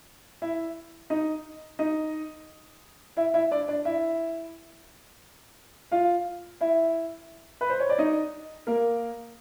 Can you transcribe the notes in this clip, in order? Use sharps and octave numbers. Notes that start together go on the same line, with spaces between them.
E4 E5
D#4 D#5
D#4 D#5
E4 E5
E4 E5
D4 D5
D4 D5
E4 E5
F4 F5
E4 E5
B4
C5
C#5
D5
D#4 D#5
A#3 A#4